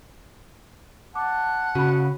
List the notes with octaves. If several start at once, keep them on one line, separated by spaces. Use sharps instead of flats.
F#5 A5 D6
C#3 F#4 B5